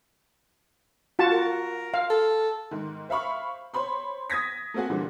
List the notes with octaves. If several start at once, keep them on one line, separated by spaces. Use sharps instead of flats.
F4 F#4 A5
A#4
F5
A4
G#2 D#3
C5 E5 F5 B5 C#6
C5 C#5 B5 C6
D#6 G#6 A#6 B6
A3 A#3 C4 F#4 G#4
A#2 D3 E3 G3